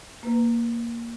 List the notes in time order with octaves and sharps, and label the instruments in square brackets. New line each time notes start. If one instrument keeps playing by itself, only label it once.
[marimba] A#3 B4